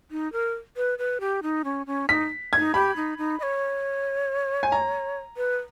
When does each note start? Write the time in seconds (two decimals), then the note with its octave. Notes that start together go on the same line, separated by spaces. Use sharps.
0.11 D#4
0.33 A#4
0.77 B4
0.99 B4
1.20 G4
1.43 D#4
1.64 C#4
1.87 C#4
2.09 D#4 B6
2.53 D#4 G#6
2.74 G4 B5
2.96 D#4
3.18 D#4
3.40 D#5
3.43 C#5
4.63 G#5
4.72 A#5
5.37 B4